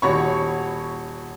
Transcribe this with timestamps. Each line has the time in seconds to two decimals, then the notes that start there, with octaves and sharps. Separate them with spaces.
0.02 D#1 F#4 C#5 B5 C#6